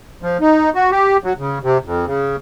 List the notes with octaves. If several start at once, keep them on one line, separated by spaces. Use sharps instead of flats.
F3
D#4
F#4
G4
F#3
C#3
C3
F2
C#3